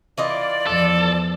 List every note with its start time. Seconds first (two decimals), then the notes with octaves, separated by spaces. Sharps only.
0.18 E3 F4 D5 D#5
0.67 E2 F3 A4